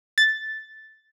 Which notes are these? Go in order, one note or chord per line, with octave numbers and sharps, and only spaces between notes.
A6